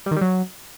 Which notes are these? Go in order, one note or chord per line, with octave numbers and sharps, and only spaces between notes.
G3
D#3
G3
F#3